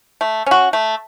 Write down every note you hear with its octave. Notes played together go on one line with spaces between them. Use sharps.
A3
C#4 F#4
A3